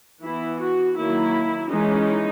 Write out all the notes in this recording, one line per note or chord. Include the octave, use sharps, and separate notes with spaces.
E3 B3 E4
F#4
D#3 F#3 A#3 E4
E3 G#3 C#4 D#4